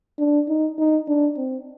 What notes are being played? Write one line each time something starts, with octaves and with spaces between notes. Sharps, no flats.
D4
D#4
D#4
D4
C4